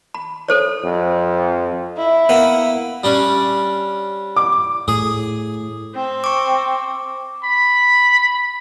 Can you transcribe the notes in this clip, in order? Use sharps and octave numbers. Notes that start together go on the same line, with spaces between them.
B5
A4 C5 C#5
F2
E4
A#3 B3
G3 C#4 D4
D6
A2 G#4
C4
C#6 D6
B5